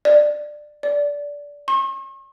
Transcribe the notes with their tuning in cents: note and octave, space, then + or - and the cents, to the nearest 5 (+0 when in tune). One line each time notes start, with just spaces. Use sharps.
D5 +15
D5 -20
C#6 -45